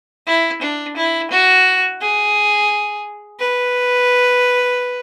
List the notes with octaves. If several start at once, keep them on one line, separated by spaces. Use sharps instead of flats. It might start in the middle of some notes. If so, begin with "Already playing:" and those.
E4
D4
E4
F#4
G#4
B4